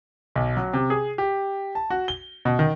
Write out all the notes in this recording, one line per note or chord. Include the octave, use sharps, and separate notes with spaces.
B1
F#3
C3
G#4
G4
A5
F#4
G7
B2
D#3